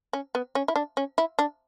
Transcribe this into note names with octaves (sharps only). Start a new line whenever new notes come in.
C#4
B3
C#4
E4
D4
C#4
E4
D4